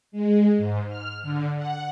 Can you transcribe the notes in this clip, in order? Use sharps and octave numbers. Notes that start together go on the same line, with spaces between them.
G#3
G#2
F6
D3
F#5